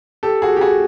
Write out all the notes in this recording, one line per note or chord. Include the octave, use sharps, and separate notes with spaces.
G4 A4
F#4 G#4
G4
F#4 G#4